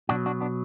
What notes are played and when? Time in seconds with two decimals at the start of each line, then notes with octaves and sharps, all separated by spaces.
0.09 B2 F#3 D4 F#4
0.26 D4 F#4
0.41 B3 D4